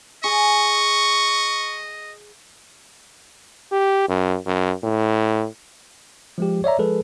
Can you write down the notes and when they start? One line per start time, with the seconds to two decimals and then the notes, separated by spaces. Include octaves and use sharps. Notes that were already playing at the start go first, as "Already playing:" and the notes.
0.24 G#4 D#5 C#6
3.72 G4
4.08 F#2
4.46 F#2
4.84 A2
6.38 F3 G#3 G4
6.64 C#5 D5 E5 A#5
6.78 F3 G#3 G#4 A4 B4